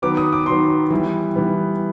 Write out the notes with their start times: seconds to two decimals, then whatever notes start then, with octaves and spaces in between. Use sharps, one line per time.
0.02 D#3 F#3 B3 D6
0.17 D#6
0.33 D6
0.46 D#3 F#3 B3 C6
0.91 E3 G3 B3
1.36 E3 G3 B3